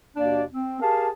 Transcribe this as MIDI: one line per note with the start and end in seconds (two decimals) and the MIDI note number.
0.16 0.42 39
0.16 0.42 47
0.16 0.42 58
0.16 0.42 62
0.16 0.42 74
0.53 0.79 60
0.81 1.08 67
0.81 1.08 68
0.81 1.08 70
0.81 1.08 77
0.81 1.08 81